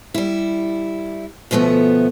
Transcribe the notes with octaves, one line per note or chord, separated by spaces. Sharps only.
G3 E4
D2 B2 F3 A3 B3